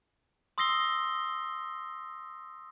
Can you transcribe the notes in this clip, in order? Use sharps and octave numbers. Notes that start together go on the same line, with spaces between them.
C6 D#6 E6 A#6 C7 G7